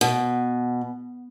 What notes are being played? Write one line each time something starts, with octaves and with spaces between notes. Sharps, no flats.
B2